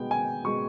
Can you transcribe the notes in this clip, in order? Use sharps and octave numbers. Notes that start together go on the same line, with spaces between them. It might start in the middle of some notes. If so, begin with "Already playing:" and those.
Already playing: B2 G#3 B3 G5
G#5
B2 G#3 B3 C#6